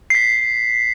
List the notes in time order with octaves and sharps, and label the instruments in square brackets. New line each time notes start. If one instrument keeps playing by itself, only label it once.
[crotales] B6 C7